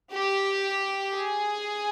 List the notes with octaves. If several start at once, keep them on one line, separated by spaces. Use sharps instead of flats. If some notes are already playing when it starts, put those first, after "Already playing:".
G4
G#4